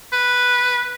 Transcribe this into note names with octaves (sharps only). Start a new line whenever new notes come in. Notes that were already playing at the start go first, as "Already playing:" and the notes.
B4